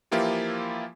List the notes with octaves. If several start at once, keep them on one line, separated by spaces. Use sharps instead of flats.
E3 F3 A#3 E4 F4 G4